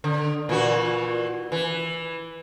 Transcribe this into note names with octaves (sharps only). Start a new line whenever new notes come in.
D3
A#2 E3 F#4
E3